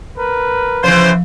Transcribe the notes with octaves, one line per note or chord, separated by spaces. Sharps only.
A#4 B4
C#3 E3 F3 C5